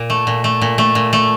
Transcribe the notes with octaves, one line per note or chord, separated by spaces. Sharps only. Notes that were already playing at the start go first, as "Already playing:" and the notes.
Already playing: A#2
A3
A#2
A3
A#2
A3
A#2
A3